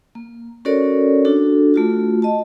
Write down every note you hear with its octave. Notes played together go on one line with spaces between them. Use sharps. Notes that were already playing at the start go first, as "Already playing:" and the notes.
A#3
C#4 F#4 A4 A#4 C#5 D5
D4 F#4 A4
A3 F4 F#4
D#5 A5